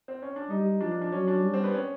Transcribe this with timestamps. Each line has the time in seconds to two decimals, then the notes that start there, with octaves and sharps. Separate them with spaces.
0.08 C4
0.22 C#4
0.36 D4
0.50 G3 D#4
0.81 F3 D4
0.91 D4
1.02 D4
1.12 F#3 C#4
1.27 D4
1.44 G3
1.54 C4
1.64 B3
1.74 C#4